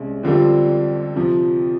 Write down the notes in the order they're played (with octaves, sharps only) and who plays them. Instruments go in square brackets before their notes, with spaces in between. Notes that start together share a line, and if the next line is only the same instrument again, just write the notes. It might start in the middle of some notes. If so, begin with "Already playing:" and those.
Already playing: [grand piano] C2 G#3 C#4
F2 D3 G3 C4 F4
F2 C3 F3